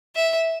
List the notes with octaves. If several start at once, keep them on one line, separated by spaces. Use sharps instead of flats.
E5